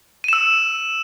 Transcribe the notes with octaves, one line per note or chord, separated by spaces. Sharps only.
E6 D#7 E7